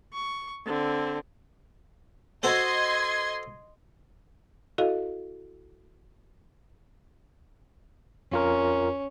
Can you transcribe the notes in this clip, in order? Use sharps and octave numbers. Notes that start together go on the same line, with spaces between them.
C#6
D3 C4
F#4 A4 C5 D#5 C6 G#6
E4 F#4 A4 D#5 F5
F2 C#4 F4 A#4